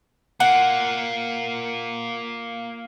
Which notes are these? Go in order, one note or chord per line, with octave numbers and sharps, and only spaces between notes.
A#3 F4 F#5